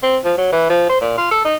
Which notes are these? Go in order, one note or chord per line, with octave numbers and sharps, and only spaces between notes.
C4
F3
F#3
E3
F3
C5
A#2
F4
A4
D#4